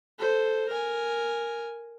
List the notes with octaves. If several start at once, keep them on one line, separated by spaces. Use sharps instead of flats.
A4 C5
A#4 G#5